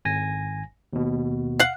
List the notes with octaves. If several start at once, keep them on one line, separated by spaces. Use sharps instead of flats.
G#1 G#5 A#6
D#2 B2
F5 F#5